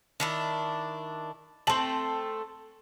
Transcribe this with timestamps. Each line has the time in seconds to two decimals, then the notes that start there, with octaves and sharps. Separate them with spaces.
0.20 D#3 D4 E4
1.67 A3 C4 A5 F#7